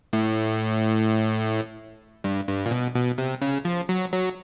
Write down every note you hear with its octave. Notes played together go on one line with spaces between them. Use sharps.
A2
G2
G2
A#2
B2
B2
C3
C#3
F3
F#3
F#3